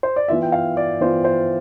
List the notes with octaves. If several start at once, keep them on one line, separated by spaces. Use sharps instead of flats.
C5
D5
E3 B3 F4 E5
G5
F5
D5
E3 B3 F4 C5
C5